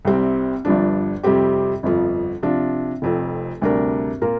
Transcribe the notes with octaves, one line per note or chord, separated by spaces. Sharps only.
C2 C3 G3 C4
G1 G2 F3 D4
F2 C3 G3 C4 G4
G1 F2 F3
C3 F3 D4 F4
F1 F2 F3 C4
D2 C3 G3 D4 A#4
A#2 A#3 F4 A#4